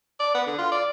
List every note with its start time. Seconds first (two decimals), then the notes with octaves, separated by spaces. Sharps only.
0.20 D5
0.34 B3
0.46 D3
0.58 F4
0.72 D5